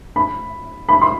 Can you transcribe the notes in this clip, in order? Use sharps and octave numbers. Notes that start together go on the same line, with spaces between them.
B5
B5
C6